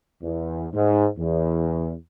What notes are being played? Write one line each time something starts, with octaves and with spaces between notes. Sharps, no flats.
E2
G#2
E2